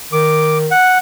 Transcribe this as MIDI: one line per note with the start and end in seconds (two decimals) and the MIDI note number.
0.13 0.69 51
0.13 0.58 86
0.71 0.98 78